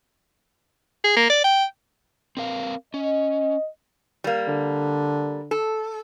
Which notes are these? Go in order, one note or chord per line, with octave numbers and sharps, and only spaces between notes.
G#4
A#3
D5
G5
C4 A#4 F5
C#4 D#5
G3 A#3
D3
A4